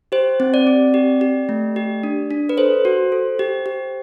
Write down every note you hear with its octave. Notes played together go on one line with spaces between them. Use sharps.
G4 C5
C4
D5
C4
G4
G4
A3
G4
D4
D4
B4
A4 C5
F#4
A4
G4
G4